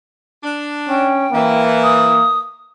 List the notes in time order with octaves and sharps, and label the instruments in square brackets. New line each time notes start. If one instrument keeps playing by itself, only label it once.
[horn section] D4
[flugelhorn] C#4 [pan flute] G5
[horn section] E3 [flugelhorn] A#3
[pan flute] D#6